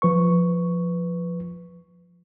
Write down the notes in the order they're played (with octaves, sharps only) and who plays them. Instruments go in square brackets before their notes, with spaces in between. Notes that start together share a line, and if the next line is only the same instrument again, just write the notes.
[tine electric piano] F3 B4 C#6